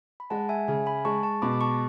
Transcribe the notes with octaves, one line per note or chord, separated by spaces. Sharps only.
B5
G#3 F#5 A5
E5 G#5
C#3 E5 G#5
G#5 B5
G#3 A5 C#6
A5 C#6
B2 B5 D6
A5 C#6